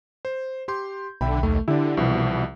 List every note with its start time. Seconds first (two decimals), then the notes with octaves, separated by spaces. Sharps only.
0.25 C5
0.68 G4 C6 G6
1.21 B1 D3 E5 G5 B5
1.43 D#2 A3
1.68 D3 D4 E4 G4
1.97 C2 B2 E3 F3